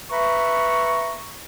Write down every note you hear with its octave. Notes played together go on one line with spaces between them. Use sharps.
B4 E5 A#5 B5 C#6